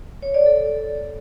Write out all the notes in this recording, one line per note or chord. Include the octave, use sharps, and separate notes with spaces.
C#5
D5
A4